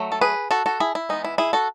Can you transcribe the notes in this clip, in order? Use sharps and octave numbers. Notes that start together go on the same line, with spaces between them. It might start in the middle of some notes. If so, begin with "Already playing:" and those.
Already playing: F#3 A3
A4
G#4 B4
F#4 A4
F#4 A4
E4 G#4
E4
E3 G#3 B3 D#4
E4
E4 G#4
F#4 A4